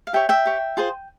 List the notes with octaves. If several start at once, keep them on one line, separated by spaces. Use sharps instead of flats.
F5
G4 C#5 E5 G5
E5 G5
G4 C#5
F4 G#4 C5